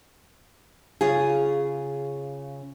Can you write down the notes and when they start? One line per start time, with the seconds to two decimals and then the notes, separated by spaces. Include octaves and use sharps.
1.01 C#3 F4 G#4